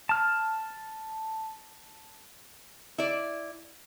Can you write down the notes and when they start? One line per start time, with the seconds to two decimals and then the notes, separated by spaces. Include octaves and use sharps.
0.09 A5 F6
2.98 E4 D5